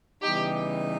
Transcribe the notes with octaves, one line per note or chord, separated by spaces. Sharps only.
C#3 E3 G3 B3 D#4 G4